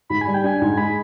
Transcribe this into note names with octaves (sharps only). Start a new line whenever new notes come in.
G#2 B5
G#5
G3
G5
D4 G#5
G#2
G#3 B5